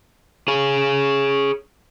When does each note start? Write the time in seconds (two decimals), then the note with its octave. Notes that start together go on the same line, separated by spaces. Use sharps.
0.48 G#4 C#5